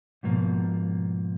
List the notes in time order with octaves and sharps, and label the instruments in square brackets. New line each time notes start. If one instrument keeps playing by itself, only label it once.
[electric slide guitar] G#2 B2 F3 A#3